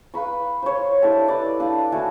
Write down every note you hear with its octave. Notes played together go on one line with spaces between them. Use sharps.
B4 F5 B5 C#6
C5 C#5
D4 E4 G4 A4
B4 D5
D4 F5
A3 F#4 F#5 G#5